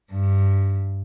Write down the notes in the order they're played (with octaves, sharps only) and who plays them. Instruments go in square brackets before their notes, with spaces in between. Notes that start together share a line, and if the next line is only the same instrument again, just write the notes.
[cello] G2